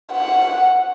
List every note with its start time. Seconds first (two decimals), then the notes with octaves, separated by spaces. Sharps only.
0.13 F#5